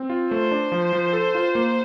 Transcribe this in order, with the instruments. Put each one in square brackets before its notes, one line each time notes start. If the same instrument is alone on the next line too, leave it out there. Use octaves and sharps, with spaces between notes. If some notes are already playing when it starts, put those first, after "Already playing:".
Already playing: [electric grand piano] C4
F4
[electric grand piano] A3 [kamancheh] C5
[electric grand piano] D4
F3
F3
A4
F4
A#3